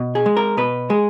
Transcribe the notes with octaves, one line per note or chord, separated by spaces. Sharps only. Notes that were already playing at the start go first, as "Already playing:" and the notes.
Already playing: B2
G#4
G#3
A#4
B2 B4
G#3 G#4